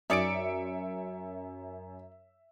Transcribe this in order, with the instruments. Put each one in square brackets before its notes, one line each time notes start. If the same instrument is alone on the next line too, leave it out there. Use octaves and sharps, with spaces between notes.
[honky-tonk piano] F#2 [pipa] D#4 G#4 D5 [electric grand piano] E5 C#7 D7